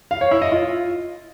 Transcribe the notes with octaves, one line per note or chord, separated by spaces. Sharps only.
F5
C#5
E4
D#5
F4